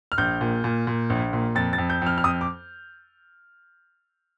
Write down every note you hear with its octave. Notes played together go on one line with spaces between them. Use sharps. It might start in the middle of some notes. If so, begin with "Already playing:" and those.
F6
A#1 G6
A#2
A#2
A#2
A#1
A#2
F2 A6
A6
F2
G6
F2 F6
F6
F2 D#6
D6